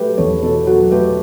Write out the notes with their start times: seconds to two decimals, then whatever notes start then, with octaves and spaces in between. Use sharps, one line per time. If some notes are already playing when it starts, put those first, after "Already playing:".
Already playing: F#3 A3 G4 A4 B4
0.18 E2 A4 C#5
0.42 B2 A4 C#5
0.67 F#3 F#4 A4
0.91 A3 G4 B4